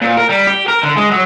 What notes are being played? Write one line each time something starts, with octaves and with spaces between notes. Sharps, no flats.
A#2
A#4
G3
G4
A#4
D3
G#3
F#3